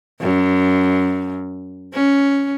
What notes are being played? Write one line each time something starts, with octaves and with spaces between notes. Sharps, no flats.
F#2
C#4